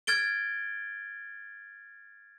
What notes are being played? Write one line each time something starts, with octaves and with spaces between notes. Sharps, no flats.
F6 G#6 A6 D7 G7